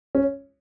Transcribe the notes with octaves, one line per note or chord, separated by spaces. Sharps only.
C#4